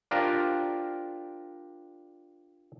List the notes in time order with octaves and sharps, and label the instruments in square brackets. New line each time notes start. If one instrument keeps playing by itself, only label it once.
[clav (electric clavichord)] D4 F4 G4 A#4 C5 D5